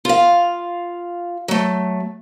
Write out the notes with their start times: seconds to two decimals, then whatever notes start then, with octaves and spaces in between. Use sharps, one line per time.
0.05 F4 F5
1.48 F#3 A3